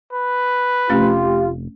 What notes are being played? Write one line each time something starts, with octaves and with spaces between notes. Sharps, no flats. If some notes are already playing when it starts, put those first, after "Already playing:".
B4
F1 A3 C#4 F4 G4